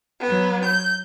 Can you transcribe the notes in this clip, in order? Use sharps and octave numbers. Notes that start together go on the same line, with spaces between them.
F#3 B3
G6